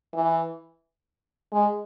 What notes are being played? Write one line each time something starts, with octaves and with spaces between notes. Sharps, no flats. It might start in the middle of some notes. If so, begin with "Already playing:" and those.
E3
G#3